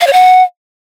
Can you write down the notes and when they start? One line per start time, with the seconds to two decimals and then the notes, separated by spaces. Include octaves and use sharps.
0.01 F5
0.07 C#5
0.13 F#5